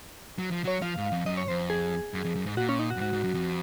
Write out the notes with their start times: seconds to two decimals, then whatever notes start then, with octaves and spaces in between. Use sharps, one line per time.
0.39 F#3
0.51 F3
0.64 F#3 C#5
0.82 F3 F5
0.97 G#2
1.12 F2
1.26 F#2 D#5
1.37 C#5
1.48 F2 C5
1.70 G#4
2.14 F#2
2.24 F2
2.36 F#2
2.46 G#2
2.57 A#2 F#4
2.69 C#4
2.79 D#4
2.90 F#4
2.96 F#2
3.01 G#2 F#4
3.13 G#2
3.24 F#2
3.34 F2